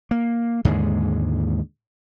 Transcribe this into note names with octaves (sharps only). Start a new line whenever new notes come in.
A#3
D#2 G#2 D3 G#3